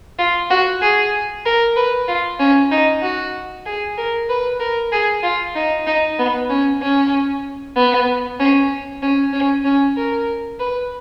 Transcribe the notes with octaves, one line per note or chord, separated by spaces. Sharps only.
F4
F#4
G#4
A#4
B4
F4
C#4
D#4
F#4
G#4
A#4
B4
A#4
G#4
F4
D#4
D#4
B3
C#4
C#4
B3
C#4
C#4
C#4
C#4
A#4
B4